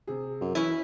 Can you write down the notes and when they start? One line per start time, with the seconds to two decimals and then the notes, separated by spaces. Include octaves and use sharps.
0.07 C3 G#4
0.41 F#2
0.55 E3 C#4 E4